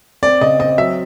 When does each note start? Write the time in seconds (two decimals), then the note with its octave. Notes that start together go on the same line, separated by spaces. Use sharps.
0.22 C4 D5
0.41 C#3 D#5
0.59 C4 D#5
0.78 F#3 E5